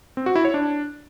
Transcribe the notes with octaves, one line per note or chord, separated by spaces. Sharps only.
C4
F#4
E4
C#5
D4